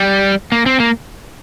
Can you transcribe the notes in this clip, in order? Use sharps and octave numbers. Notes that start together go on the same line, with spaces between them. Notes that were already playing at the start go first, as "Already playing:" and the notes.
Already playing: G3
A#3
C4
A#3